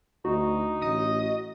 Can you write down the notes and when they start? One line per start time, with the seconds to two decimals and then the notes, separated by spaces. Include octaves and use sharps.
0.25 D2 D#4 F#4
0.82 A1 D#5